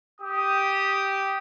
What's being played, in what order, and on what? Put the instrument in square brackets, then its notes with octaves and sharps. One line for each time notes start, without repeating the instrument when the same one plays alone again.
[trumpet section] G4 D#6